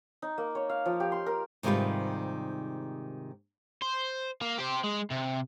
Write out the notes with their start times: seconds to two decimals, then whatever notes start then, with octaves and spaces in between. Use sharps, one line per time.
0.22 D#4
0.38 A#3
0.55 C#5
0.69 F5
0.86 F3
1.00 G4
1.12 C6
1.26 A#4
1.63 G#2 C3 D#3 G3 F4 B4
3.82 C5
4.41 A#3
4.58 G4 C5
4.84 G#3
5.11 C3